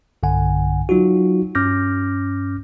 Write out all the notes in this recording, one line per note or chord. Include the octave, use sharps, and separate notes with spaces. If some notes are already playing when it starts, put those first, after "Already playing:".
B1 G2 D3 F#5 G#5
F#3 D#4 F4 F#4
G2 C#4 D6 F6 G6 A#6